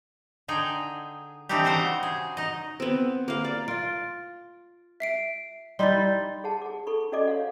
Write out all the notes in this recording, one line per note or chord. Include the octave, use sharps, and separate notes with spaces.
D3 D#4 G#4 G5
E3 A3 C4 D4 D#4 G4
C#3 F#4 A#4 C5 F#5
G#4
D#4 D#5
B3 C4
A#3 F5
D5
F4 A6 D7
E5 C7 D7
G3 D#4 E4 C6 G6 A6
G#4 F#5 A5
G#4 D6
A4 B5 C#6
C#4 F#4 A4 D5 D#5 D6
C#5 F5 F#5